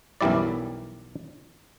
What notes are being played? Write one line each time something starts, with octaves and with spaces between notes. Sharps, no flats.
B1 F#2 E3 G3 E4 D5